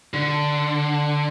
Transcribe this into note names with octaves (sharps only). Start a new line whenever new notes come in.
D3